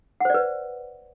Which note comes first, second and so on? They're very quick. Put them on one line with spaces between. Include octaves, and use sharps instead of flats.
F#5 C5 D5 B4